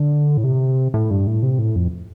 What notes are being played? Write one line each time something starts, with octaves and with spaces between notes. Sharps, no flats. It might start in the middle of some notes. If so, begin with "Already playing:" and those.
Already playing: D3
A2
C3
A2
G2
A2
C3
A2
F2